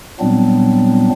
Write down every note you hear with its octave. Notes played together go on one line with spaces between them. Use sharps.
A#2 F#3 G3 B3 C4 D4